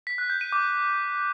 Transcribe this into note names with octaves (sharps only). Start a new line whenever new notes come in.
B6
F#6
G6
D#7
D6